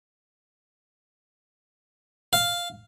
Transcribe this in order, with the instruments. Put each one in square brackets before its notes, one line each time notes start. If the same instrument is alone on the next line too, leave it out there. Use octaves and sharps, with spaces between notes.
[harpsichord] F5